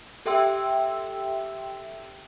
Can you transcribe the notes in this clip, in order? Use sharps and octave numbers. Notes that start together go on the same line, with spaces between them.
G4 A4 E5 G5 C6 E6